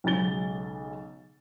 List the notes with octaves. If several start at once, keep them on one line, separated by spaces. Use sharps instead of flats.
B1 C#3 F#3 G#3 A6 G7